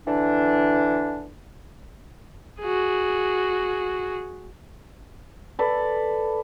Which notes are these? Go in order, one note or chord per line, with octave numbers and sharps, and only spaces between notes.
D3 E3 D4
F#4 G#4
A4 B4 D5